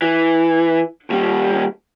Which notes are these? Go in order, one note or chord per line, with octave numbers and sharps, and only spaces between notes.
E3
D#2 G3